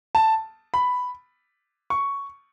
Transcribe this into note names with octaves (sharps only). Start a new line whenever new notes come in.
A5
B5
C#6